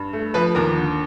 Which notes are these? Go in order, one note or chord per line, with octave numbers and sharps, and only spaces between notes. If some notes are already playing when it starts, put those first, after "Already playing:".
Already playing: G2
A3
F3 B4 B5
D#2 A#4 A#5
D3